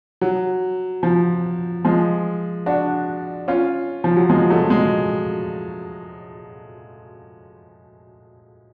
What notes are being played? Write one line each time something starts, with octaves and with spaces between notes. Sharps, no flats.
F#3
F3
F3 G#3
D4 F#4
C#4 F4
F3
F#3
F3 G#3
F#3 A3
G#3